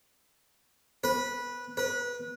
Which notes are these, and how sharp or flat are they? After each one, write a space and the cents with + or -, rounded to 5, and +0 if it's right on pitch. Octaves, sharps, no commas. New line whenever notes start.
B4 -15
B4 -25